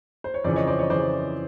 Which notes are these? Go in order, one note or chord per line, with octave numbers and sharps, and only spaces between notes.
C5
C#5
F2 C#3 E3 C5 D5
C#5 D#5
C5 D5
C#5 D#5
F2 C#3 E3 C5 D5